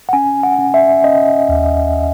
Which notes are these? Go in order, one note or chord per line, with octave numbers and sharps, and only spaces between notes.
F#5
C#4 G#5
F#5
C#4
E5
C#4 D#5
D#2